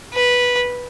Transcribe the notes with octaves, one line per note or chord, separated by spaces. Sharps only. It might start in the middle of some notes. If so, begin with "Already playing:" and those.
B4